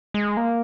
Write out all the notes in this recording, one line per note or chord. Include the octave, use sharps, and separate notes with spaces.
G#3
A#3